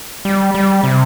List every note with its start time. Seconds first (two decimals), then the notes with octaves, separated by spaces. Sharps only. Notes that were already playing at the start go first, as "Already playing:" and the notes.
0.25 G3
0.55 G3
0.84 C3